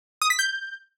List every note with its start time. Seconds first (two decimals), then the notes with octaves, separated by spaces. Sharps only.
0.22 D#6
0.30 B6
0.39 G6